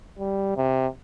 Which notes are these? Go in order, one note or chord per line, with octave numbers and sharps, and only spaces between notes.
G3
C3